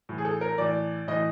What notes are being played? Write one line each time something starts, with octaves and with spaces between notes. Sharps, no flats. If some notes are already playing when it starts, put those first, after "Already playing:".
A2 E3
G#4
A4
A#4
A2 E3 D5
A2 E3 D#5